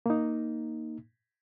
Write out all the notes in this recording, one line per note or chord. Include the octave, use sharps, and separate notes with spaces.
A#3 D#4